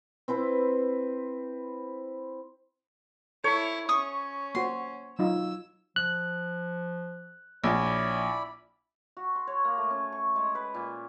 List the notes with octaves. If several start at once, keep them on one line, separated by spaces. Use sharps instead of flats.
C4 E4 B4 C5
E4 A4 C#5
C#4 C#6 D#6
A#3 F#4 C5 C6
F#3 D#4 F4 E6
F3 F#6
A#1 E4 C#5 D5 B5
F#4
C6
C#5
A#3
A3
C#4
C#6
G#3
B4
A#2